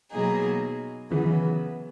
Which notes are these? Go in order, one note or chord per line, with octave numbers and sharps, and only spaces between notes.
B2 F#3 A#3 D#4 G#4
C#3 E3 F#3 B3